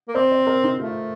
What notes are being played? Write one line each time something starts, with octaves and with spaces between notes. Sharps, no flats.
A#3
C4 C5
C5
A#4
D#4
A3 F4